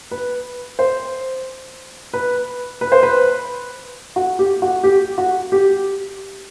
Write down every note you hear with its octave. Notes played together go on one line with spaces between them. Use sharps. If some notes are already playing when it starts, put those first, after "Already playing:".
B4
C5
B4
B4
C5
B4
F#4
G4
F#4
G4
F#4
G4